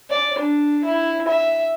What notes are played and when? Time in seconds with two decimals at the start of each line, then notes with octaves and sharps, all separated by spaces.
0.10 D5
0.39 D4
0.84 E4
1.28 E5